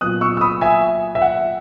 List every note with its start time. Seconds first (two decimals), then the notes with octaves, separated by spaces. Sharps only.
0.01 A#2 F#3 B3 D#6 F#6
0.21 C#6 E6
0.37 E6
0.41 B5 D#6
0.61 E5 G#5
1.15 E5
1.22 F#5